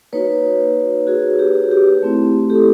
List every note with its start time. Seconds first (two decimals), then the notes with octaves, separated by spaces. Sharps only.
0.13 A#3 D#4 F#4 B4 C#5
1.07 F#4 G#4
1.39 G4
1.71 G4
2.03 A3 C4 E4
2.50 G4 A4